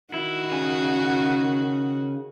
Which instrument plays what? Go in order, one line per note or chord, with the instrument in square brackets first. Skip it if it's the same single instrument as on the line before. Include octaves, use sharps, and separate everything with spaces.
[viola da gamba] D#3 F#4 [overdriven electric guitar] E4
[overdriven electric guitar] C#3 G#5